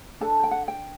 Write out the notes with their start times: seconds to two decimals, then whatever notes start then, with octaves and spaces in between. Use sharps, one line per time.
0.21 D4 A4 A5
0.44 G5
0.51 F#5
0.68 G5